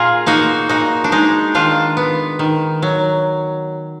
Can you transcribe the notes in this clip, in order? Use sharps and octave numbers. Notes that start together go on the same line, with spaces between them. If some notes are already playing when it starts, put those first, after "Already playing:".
Already playing: A#2 F4 G#4 A#4
A#3 D#4 F#4
A#2 D#4 F#4
D4
G#3 D#4
D#3 D4 F4
B3
D#3
F#3